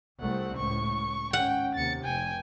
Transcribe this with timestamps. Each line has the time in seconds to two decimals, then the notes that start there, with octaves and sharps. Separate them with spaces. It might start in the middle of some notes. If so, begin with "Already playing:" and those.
0.21 C2 A3 C4 F#5
0.57 C#2 A2 C#6
1.33 G#1 C#4 F#5 G5
1.75 D#2 C3 A6 C#7
2.04 F1 G5 G#5